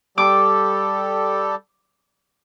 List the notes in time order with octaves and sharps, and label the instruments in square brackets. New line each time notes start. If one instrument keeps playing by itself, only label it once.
[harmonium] G3 G4 A4 [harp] D6